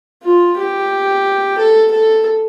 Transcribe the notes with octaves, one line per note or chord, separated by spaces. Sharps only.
F4
G4
A4
A4